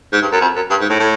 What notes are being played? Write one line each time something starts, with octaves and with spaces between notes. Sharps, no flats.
G#2
G2
F#2
F2
F#2
G2
G#2
A2
A2